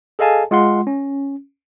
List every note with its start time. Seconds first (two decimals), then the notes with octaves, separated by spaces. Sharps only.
0.19 G#4 A4 D#5 F5 G#5 A5
0.51 G#3 F4 F#5 C6
0.87 C#4